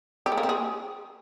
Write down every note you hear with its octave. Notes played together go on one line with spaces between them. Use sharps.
G4
G#3
A#3
C4
G#4